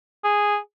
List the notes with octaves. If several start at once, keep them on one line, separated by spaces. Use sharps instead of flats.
G#4